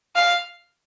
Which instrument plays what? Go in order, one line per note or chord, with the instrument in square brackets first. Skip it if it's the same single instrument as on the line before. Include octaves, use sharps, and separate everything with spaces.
[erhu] F5